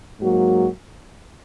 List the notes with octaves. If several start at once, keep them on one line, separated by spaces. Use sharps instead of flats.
G#2 F#3 A#3 F#4